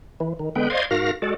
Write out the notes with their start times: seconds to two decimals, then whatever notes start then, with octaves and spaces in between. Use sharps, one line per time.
0.20 E3
0.39 D#3
0.56 D3 G#3 B3 B4 G5
0.70 C5 D5 D#5 F5 C6 G#6
0.91 G#2 F#4 A#4 F5 A#6
1.22 G#3 F#4 A4 D5